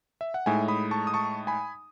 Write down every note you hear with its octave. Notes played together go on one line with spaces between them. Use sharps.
E5
F#5
A2 G#3 D#4 E5 G#5
B5 D#6
A5 C#6
D#6
A5 C#6
G#5 B5